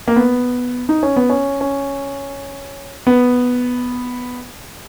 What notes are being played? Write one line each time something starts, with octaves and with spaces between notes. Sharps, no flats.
A#3
B3
D#4
C#4
B3
C#4
C#4
B3